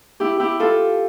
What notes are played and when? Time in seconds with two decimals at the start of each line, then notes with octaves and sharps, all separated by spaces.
0.20 E4 G4
0.40 E4 G4
0.60 F4 A4